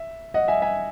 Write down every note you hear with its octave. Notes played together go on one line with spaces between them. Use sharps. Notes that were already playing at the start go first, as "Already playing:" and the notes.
Already playing: E5
D#5 F#5
E5 G#5
E5 G#5